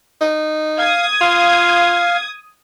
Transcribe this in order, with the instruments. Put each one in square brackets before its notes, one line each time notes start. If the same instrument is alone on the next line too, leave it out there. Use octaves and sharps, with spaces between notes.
[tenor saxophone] D#4
[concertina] F5 [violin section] D#6 G#6
[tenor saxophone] F4 [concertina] F5